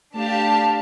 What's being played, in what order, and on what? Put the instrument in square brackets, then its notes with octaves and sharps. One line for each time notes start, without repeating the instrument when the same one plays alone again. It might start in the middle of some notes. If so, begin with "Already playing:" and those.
[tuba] A3 [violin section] D4 G4 F5 A5